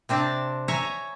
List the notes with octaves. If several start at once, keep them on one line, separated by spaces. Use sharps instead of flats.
C3 C4 D4 A5
C#5 E5 G#5 A#5